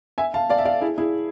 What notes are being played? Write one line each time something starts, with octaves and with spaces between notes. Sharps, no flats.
E5 G#5
F5 A5
D5 F5
E5
D5 F5
E4 G#4
E4 G#4